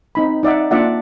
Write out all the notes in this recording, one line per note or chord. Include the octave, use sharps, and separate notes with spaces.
C4 D#4 B5
D#4 D5 E5 F#5
A#3 D4 F4 D5 E5 F#5